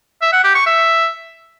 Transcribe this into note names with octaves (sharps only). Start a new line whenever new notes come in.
E5
F#5
G4
C#6
E5